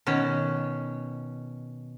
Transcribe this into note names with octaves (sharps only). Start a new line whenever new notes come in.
B2 D#3 C#4